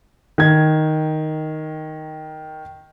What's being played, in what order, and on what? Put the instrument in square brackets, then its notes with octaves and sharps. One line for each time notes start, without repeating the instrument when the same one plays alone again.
[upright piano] D#3 G#6